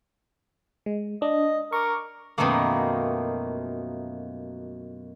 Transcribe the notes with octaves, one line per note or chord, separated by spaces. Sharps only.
G#3
D4 D#5
A#4 C#6 D6
F#2 B2 D#3 F3 A3 A#3